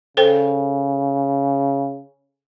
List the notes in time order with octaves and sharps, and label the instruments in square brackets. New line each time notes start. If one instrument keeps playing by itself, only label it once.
[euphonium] C#3 [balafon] A4 C5 G5